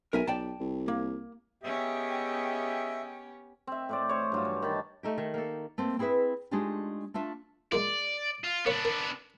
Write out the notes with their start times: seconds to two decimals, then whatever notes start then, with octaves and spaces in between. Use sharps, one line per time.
0.13 B1 A#4 E5 G#5
0.27 B1 D5 G5 A5
0.60 C2
0.88 A#3
1.63 B3 C#4 G4 G#4 D#5 E5 G5
3.67 C4 E5
3.89 A2 C5 D5
4.09 C5 C#5
4.32 G2 F#3 F4
4.45 E3
4.62 D#3 A5 B5
5.03 A3 D#4 G4
5.18 D#3
5.34 A#3 A4
5.78 A3 A#3 C4
5.99 C4 E4 G#4 B4 E5
6.51 G#3 A3 D4 D#4 F4 G4
7.14 A3 D4 F4 E5
7.72 G#3 A#3 F4 D5
8.44 F4
8.66 A#3 B3 D4 C#5
8.85 A#4